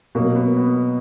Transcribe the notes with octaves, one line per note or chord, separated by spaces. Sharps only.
B2 F#3 A#3
B3
B3